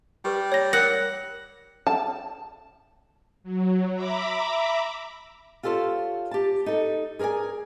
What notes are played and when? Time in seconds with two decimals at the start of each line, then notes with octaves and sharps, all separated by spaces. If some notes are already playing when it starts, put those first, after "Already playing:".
0.25 G3 G4 B4
0.52 C#5 A#6
0.73 A#4 F#5 A#6
1.87 A5
3.43 F#3
3.95 E5 A#5 B5 D6
5.63 F4 G4 A4 C5 C#5
6.31 G4 A5
6.66 D#4 A4
7.19 G#4 A#4 C#5 D5 G#5